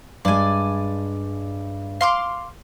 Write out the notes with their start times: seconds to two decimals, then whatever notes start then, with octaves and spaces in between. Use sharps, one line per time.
0.25 G2 G#3 D5 G#5
2.01 F5 C6 D6